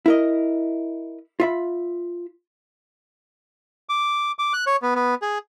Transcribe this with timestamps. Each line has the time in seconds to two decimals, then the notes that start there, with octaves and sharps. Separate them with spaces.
0.06 E4 A#4 D#5
1.40 F4 E5 B5
3.89 D6
4.39 D6
4.53 F#6
4.67 C#5
4.82 B3
4.95 B3
5.22 G#4